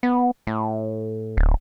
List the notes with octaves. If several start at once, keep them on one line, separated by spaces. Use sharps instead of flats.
B3
A2
D1